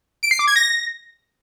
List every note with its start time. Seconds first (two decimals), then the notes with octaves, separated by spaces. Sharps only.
0.23 D7
0.31 C7
0.39 D6
0.47 G#6
0.56 A#6